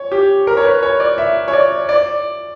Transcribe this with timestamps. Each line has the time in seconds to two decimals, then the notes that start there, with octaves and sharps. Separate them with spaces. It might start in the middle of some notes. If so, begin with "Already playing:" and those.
Already playing: C#5
0.12 G4
0.47 A#4
0.57 C#5
0.65 B4
0.83 C#5
1.00 D5
1.18 E5
1.48 C#5
1.53 D5
1.89 D5